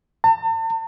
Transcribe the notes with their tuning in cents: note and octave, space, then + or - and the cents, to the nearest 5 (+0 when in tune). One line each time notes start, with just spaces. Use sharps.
A5 +45